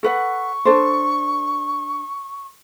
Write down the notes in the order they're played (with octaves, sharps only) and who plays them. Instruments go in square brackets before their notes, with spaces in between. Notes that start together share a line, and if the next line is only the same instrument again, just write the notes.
[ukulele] A4 B4 F#5 [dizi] C#6
[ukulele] D4 A4 C5